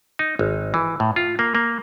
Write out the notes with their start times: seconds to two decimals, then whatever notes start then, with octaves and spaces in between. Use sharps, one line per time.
0.19 D#4
0.39 G#1
0.74 E3
1.00 A2
1.16 F4
1.39 A#3
1.55 A#3